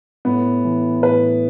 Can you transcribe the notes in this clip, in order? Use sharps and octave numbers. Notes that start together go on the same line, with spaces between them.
A2 B3
E3
A2 B4